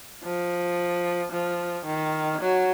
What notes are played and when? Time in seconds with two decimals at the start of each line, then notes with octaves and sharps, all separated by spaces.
0.23 F3
1.32 F3
1.86 D#3
2.41 F#3